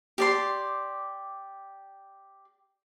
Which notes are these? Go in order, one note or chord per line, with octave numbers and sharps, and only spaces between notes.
G4 D5 C6